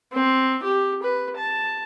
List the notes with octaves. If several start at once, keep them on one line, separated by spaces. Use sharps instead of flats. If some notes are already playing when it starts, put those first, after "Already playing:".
C4
G4
B4
A5